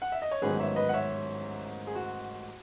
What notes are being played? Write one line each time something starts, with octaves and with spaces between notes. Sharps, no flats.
F#5
E5
D#5
C#5
A1 G#2 D#3 F#3 B3 G#4 B4
C#5 E5
B4 D#5
F#5
C#5 E5
G#4
F#4